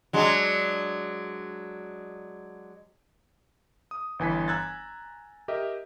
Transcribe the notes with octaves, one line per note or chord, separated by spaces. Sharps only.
F#3 G#3 D4
D#6
G1 E3 G#5 B6
G#5 A#5 E6 F#6 G#6 A6
G4 A#4 D#5 E5